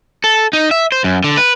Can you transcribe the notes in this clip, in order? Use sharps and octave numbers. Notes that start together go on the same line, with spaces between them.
A4
D#4
E5
C5
F#2
D3
B4